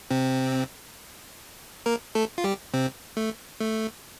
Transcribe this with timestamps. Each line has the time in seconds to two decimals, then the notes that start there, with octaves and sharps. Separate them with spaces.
0.10 C3 C4
1.86 A#3 A#4
2.15 A3 A4
2.38 F4
2.44 G3 G4
2.74 C3 C4
3.17 A3
3.60 A3